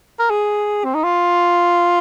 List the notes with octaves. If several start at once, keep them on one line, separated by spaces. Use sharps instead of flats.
A#4
G#4
C4
D#4
F4